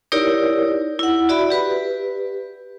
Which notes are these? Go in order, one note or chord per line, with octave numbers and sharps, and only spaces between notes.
D#4 E4 G4 A#4 C#5 D5
E4 F#5
F#4 D5 E5 B5
G4 B4